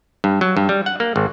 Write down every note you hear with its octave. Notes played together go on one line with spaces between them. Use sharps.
G2
F#3
G2
G3
F#5
A#3
G#1